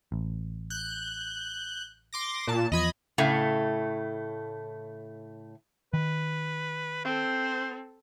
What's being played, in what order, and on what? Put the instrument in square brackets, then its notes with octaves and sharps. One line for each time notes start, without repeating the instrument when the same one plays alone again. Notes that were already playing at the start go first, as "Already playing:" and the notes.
[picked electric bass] A1
[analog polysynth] F#6 G6
C6 D6 A#6
A#2 A5
[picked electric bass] E2 F3 [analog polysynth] D#5 B5 G#6
[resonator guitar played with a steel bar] A2 C#3 A3
[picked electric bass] D#3 [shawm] B4
[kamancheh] C4 A4 [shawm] C5